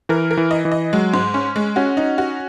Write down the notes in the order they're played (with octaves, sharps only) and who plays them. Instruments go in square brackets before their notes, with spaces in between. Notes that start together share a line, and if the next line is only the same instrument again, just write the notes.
[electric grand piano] E3 [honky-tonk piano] A#4
[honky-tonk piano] A#4
[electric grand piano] E3
[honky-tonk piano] D#5
[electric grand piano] E3
[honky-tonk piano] D#5
[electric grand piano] F#3 [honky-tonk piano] G#3
[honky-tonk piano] G#2
C#4
G#3
[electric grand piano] C#4 [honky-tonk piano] F#4
[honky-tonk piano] D#4
F#4